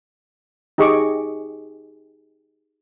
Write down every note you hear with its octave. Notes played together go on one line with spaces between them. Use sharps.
D#4 G4 G#4 D#5 C#6 D6